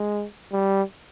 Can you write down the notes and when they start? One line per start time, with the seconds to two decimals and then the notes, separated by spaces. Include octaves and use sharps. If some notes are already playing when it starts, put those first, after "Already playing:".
Already playing: G#3
0.52 G3